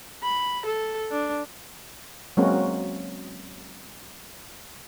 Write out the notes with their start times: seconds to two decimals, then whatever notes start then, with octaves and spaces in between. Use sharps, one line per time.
0.24 B5
0.66 A4
1.11 D4
2.37 F#3 G#3 A#3 C4 C#4 F#4